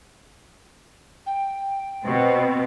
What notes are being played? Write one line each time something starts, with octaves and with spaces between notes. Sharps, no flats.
G5
B2 C4